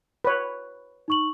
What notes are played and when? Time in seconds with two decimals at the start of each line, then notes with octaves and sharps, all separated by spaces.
0.25 B4 C#5
1.08 D#4 C#6 F#7